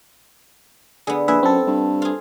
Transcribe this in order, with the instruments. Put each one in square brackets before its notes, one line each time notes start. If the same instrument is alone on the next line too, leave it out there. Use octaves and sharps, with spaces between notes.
[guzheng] D3 B3 [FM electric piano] G#4
[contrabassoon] A#1 [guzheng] E4 [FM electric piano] G#4 B4 E5
[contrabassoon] F#2 [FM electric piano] C4 A4
[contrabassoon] G2
[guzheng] F4 G#4